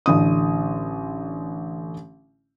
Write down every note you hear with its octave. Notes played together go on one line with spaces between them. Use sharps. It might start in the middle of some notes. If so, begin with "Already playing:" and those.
A1 D3 D#6